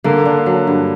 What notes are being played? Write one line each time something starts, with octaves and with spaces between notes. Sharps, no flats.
D3 A#3
D4
F#3
G2